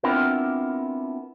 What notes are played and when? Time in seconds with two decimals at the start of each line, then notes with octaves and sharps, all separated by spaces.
0.04 B3 C4 D4 E4 F4 A#4